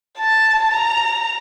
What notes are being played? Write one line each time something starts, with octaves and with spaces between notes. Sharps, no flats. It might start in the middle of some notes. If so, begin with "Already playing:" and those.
A5
A#5